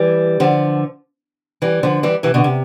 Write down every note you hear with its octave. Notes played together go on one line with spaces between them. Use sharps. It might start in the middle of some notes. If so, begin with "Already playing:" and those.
Already playing: E3 G3
D3 F3
E3 G3
D3 F3
E3 G3
C3 E3
B2 D3
C3